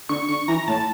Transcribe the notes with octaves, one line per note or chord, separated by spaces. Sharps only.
D3 C#6
D3 C#6
E3 A#5
A2 A5